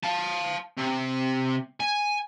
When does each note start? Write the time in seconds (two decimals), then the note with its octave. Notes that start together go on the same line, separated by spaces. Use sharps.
0.04 F5 A5
0.77 C3
1.80 G#5